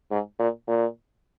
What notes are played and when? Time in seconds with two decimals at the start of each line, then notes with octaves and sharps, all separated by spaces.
0.11 G#2
0.39 A#2
0.68 A#2